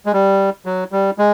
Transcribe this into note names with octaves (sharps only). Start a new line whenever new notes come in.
G#3
G3
F#3
G3
G#3